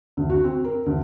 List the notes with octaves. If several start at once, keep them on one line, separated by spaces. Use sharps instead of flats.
D2
F#4
C4
A#4
D2